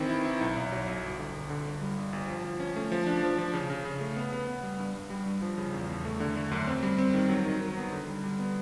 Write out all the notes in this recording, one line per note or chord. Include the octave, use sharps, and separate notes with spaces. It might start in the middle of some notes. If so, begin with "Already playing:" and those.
Already playing: D#3 E3 C4
E4
E4
B1
B1
F#3
B1
G1
D3
G1
D3
G1
G3
G1
G1
F3
F3
C#4
A3
F3
D4
F3
F3
C#3
C#3
C#3
A3
B3
B3
B3
G3
G2
G2
G3
G2
F3
C#3
E2
E2
A3
D3
A3
F#2
C4
G3
C4
D#3
F#3
D#3
D#3
B3
D3
G3
G3
B3